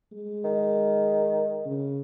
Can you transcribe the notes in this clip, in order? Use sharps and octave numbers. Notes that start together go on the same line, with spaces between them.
G#3
D#3
C#3